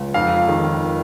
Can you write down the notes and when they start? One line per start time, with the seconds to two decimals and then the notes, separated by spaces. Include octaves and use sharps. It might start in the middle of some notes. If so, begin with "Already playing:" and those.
Already playing: C#2
0.14 F2 F5
0.48 D#3